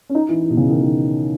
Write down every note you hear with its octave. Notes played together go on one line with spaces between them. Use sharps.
C#4
D#4
E3
E3
B2
C#3
D#3
D#3